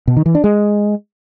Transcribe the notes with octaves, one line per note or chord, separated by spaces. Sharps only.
B2
D#3
E3
D4
G#3